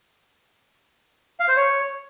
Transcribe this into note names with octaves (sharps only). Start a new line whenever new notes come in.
F5
C5
C#5